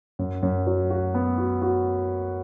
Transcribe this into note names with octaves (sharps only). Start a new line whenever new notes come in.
F#2
F#2
F#3
F#4
B3
F#4
F#4